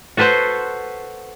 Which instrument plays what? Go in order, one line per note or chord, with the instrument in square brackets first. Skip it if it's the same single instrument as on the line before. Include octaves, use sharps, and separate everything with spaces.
[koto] F#4 A4 B4 C5 F#5